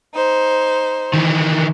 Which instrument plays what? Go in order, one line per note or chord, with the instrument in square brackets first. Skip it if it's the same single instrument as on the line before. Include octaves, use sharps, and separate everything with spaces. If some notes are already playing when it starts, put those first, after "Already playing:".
[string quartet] D#4 C5
[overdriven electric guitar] D#3 E3